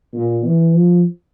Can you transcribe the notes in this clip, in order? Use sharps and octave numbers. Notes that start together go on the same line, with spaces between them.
A#2
E3
F3